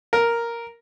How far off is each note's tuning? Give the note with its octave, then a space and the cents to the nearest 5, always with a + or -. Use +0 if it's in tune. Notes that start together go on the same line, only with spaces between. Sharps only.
A#4 +0